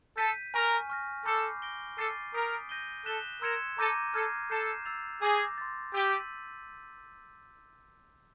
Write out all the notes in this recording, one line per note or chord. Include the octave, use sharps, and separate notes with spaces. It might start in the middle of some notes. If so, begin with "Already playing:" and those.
A4 G6 B6 D#7
A#4 G#5 C#6 F6
C#6 F6 A#6
A4 B5 D6 G6 C7
G6 A#6 D7 G7
A4 D6 F6 A6 C7 D#7
A#4 D#6 G6 B6 D7
G6 A#6 D#7 G7
A4 F#6 B6 E7 G7
A#4 C6 E6 G#6 C#7 E7
A4 A#5 D6 G6 A#6 D#7
A4 F6 G#6 C7
A4 G6 C7 E7
E6 A6 C7 F7
G#4 D6 G6 A#6
C6 E6 A6
G4 E6 G6 B6 D#7 F#7